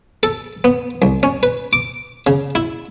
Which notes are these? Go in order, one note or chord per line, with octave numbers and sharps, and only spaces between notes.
A4
B3
C2
C#4
B4
D6
C#3
E4